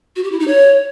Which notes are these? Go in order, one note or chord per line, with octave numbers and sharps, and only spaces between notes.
F#4
G4
E4
D#4
C#5